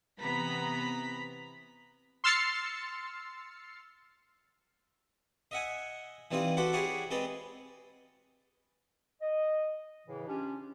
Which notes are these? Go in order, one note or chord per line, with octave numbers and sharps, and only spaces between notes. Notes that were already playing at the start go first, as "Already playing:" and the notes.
C3 E3 B3 A#5 B5 B6
C6 E6 F6 A6 C7 C#7
D#5 E5 F#5 G#5
E3 G3 C4 D#4 F4
F#4 A4 B4 C5 D5 F#5
E4 G4 G#4 C#5 D5 F#5
G#3 C4 B4 D5 D#5
D#5
A2 C#3 E3
C#4 D4 F4 G4